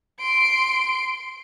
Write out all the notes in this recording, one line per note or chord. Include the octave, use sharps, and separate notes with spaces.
C6 D7